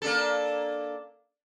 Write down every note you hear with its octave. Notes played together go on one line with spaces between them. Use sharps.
A#3 D4 A4